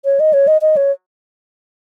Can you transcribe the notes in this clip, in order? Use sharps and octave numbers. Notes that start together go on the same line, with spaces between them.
C#5
D#5
C#5
D#5
D#5
C#5